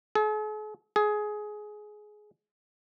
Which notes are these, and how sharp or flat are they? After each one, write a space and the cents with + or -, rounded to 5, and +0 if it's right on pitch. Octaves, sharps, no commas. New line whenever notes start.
G#4 +45
G#4 +15